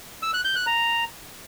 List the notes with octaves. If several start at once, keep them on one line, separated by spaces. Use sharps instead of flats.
E6
F#6
G6
F#6
A#5